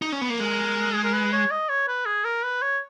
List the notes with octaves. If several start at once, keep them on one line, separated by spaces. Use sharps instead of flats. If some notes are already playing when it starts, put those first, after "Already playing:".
D#4
C#4
B3
A#3
G#3 A#4
G#4
A#4
B4
C#5
D#5
C#5
B4
G#4
A#4
B4
C#5